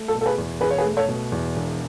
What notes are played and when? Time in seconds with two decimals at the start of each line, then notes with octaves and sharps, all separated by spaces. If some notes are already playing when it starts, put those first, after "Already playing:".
Already playing: A3
0.08 A4
0.15 B2
0.21 A4
0.26 G#4 B4
0.38 E2
0.61 E1 G#4 B4
0.71 C#5
0.78 G#4 B4
0.85 A3
0.97 A4 C#5
1.09 B2
1.32 E2
1.56 E1